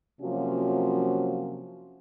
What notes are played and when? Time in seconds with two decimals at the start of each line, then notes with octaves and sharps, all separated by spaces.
0.21 C3 F3 F#3 A#3 C#4 F#4